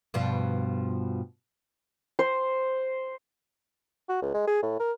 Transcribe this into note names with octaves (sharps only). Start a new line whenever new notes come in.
G2 B2 F3
C5
F#4
C#2
G#3
G#4
A2
A#4